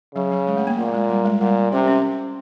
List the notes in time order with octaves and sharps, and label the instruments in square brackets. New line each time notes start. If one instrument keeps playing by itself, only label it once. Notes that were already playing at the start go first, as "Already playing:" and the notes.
[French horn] C#3 [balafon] F#3
[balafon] F#3
G#3
A3
A#3
[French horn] A#2 [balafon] A3
[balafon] G#3
G3
G#3
[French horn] A#2 [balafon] G3
[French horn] C3 [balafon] C#4
[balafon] C#4